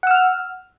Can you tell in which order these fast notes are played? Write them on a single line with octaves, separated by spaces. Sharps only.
F#5 E6 F6